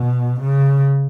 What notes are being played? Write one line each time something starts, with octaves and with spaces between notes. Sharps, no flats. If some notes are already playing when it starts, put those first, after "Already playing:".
Already playing: B2
C#3